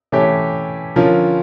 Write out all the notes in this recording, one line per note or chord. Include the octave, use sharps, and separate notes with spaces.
E3 A3 C#4 G4 C#5
D3 F3 C#4 F4 A#4